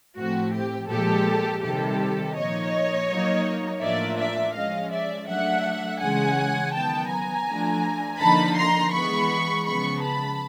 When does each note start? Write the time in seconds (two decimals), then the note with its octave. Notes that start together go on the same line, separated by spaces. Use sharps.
0.17 A2 F3 A3 C4 F#4
0.54 G4
0.90 A#2 F3 G#3 G4 A4
1.63 C3 D#3 G3 G4 A4
2.36 A#2 F3 A#3 D#4 C#5 D#5
3.09 F#3 A#3 D#4
3.82 A2 F3 A#3 D4 F4 D5 E5
4.19 D5 E5
4.55 F3 G#3 C#4 D#5 F5
4.92 D5 E5
5.28 F#3 A3 D4 E5 F#5
6.01 C#3 E3 G#3 C#4 F#5 G#5
6.74 D#3 F#3 B3 G5 A5
7.10 G#5 A#5
7.47 F3 A3 D4 F4
8.20 D3 F3 A#3 D#4 A5 B5
8.57 A#5 C6
8.93 E3 G#3 B3 B5 C#6
9.66 C#3 F3 G#3 B3 B5 C#6
10.02 A5 B5